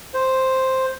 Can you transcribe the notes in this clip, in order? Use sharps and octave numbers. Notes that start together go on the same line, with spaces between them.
C5